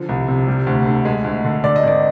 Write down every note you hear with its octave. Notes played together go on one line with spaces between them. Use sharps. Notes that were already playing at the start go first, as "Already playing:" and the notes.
Already playing: D3 F3
C2
C3
G3
D2
D3
G#3
D2
D3
D3 D5
D#5
G#1 D5